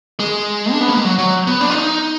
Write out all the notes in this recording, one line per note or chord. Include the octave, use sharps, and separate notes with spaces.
G#3
D4
B3
A#3
G#3
F#3
F#3
B3
D4
F4
D#4